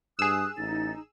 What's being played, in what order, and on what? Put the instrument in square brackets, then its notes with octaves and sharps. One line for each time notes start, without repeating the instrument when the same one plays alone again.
[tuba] G2 [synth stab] G#4 E6 [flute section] D#6 [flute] F#6
[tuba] A1 [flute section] D#4 [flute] A6